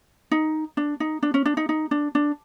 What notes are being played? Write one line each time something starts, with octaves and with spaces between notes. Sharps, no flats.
D#4
D4
D#4
D4
C#4
D4
D#4
D#4
D4
D4